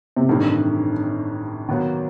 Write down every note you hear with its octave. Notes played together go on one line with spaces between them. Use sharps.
C3
A1 G2 D#3 E3 A3 C4
D#2 D#3 F#3 B3